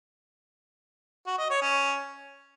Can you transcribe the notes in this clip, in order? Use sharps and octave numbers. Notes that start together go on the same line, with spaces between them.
F#4
D#5
C#5
C#4